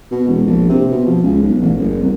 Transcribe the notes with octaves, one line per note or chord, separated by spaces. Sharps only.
B2
E1
A#1
C3
B2
F3
C#2
B1
A1
F#1
C2